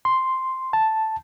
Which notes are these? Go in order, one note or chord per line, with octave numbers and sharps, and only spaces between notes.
C6
A5